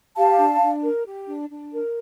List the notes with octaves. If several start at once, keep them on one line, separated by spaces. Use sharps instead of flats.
G4 F5 A5
D4
D4
A#4
G4
D4
D4
A#4